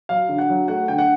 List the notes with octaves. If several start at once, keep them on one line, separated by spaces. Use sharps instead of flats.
F#3 F5
D3
F#5
F#3
A3 F#5
D3 G5
F#5